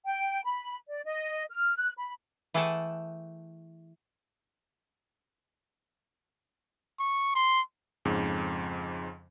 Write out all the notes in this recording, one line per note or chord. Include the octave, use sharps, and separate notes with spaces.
G5
B5
D5
D#5
F6
F#6
B5
E3 A3 G#4 F#5 G5 A5
C#6
C6
F2 G#2 C#3